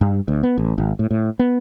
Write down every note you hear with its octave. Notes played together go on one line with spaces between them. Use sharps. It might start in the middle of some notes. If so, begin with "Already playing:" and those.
G2
D2
B3
A1
G#1
A2
A2
B3